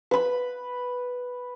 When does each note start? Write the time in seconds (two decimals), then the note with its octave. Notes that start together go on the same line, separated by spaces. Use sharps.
0.11 B4 B5